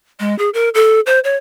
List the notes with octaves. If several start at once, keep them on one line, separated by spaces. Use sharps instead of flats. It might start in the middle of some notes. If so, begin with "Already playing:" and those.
G#3
G#4
A#4
A4
C5
C#5